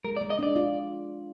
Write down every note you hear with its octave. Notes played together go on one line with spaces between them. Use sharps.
G#3 A#4
D5
G#3
D#5
D4 D5
F4